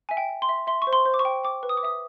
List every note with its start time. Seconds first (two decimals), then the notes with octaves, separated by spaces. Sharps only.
0.09 E5 G#5
0.17 G5
0.29 G5
0.42 C6
0.49 E5
0.67 E5 C6
0.82 C#6
0.87 C5
0.93 C6
1.05 C5
1.14 D6
1.19 C#6
1.25 G5
1.44 G5 D6
1.63 B4
1.69 D#6
1.77 D6
1.83 E5 D#6